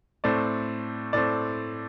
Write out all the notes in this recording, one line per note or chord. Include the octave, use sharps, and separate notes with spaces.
A2 A3 C4 D5
A2 A3 C4 D5